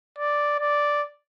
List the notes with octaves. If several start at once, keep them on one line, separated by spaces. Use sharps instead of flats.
D5
D5